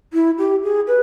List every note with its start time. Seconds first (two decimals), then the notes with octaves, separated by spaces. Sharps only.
0.13 E4
0.38 G4
0.63 G#4
0.87 B4